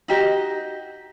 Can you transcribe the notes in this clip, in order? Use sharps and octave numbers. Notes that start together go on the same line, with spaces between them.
D#4 F#4 G4 D#5